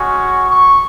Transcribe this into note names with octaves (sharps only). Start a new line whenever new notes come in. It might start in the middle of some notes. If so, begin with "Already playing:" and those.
Already playing: G#3 C#4 F#4 C#6
C#6